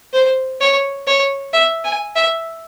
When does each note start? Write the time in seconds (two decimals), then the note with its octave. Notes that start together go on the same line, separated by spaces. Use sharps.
0.13 C5
0.60 C#5
1.07 C#5
1.53 E5
1.84 G#5
2.15 E5